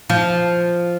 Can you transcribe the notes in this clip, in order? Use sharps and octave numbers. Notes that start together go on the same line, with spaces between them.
F3